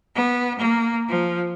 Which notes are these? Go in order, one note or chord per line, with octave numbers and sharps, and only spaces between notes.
B3
A#3
F3